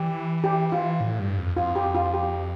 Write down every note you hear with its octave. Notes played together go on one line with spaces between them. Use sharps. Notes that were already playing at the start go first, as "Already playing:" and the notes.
Already playing: E3 G4
G4
F4
A2
G2
F2
F2 F4
G4
F4
G4